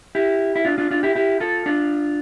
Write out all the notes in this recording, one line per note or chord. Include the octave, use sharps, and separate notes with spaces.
E4 G4
E4
D4 F4
D4 F4
D4 F4
E4 G4
E4 G4
F4 A4
D4 F4